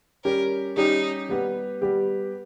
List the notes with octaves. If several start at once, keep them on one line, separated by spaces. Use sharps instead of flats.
G3 C#4 G4 A#4
G3 C#4 D#4 G4
G3 B3 G4
G3 B3 G4